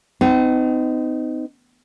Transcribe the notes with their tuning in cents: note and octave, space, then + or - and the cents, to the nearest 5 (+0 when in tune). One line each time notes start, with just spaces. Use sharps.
C4 -45 D#4 +0